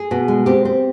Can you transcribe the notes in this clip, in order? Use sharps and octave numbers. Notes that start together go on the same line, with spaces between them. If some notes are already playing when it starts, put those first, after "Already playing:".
Already playing: G#4
B2
G#3
C4 G4
C4